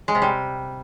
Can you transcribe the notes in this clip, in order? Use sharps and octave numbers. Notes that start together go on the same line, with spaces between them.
G#3
C3
G3